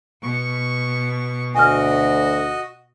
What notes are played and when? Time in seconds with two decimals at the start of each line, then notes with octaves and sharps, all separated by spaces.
0.23 B2 C#6
1.55 D2 F#4 D#5 G#5 F6